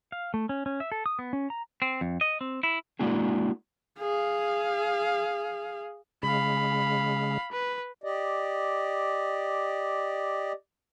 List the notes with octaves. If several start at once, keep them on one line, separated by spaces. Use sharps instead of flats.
F5
A3
C#4
C#4
E5
A4
D#6
B3
C#4
A#5
C4
F2
D#5
C4
E4
G#3 A#3 D4 E4 F#4 G#4
G#4 F5
C#3 G#3 F5 B5
B4
G4 D5 D#5